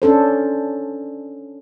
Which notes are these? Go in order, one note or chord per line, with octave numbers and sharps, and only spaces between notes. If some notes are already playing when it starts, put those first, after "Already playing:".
C#4 D4 A4 C5